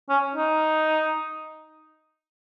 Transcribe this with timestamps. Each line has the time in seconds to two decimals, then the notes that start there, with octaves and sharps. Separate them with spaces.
0.09 C#4
0.36 D#4